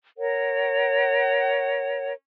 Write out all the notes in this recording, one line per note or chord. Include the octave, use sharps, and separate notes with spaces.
A#4 C#5 F#5